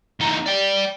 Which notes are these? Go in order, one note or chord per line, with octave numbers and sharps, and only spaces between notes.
E2 D#4
D5 G5